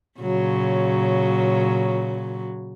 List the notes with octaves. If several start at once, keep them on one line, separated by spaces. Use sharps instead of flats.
A#2 C#3 F#3